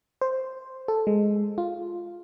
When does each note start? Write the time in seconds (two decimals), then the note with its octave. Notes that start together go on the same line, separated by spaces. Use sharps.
0.22 C5
0.88 A4
1.07 G#3
1.58 F4